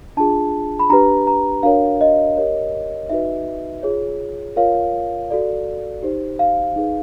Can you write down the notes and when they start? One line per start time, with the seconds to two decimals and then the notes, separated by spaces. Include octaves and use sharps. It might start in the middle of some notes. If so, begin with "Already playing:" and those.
0.17 D4 F4 G#4 A5
0.79 B5
0.90 D4 G4 B4 A#5
1.27 A#5
1.63 D4 F#4 A#4 C#5 F5
2.01 D#5
2.37 G4 A#4 C#5
3.10 D#4 F#4 B4 E5
3.83 F4 G#4 C#5
4.56 F4 A#4 C#5 F5
5.30 F#4 A4 D5
6.03 D#4 G4 C5
6.39 F5
6.76 D#4 G#4 B4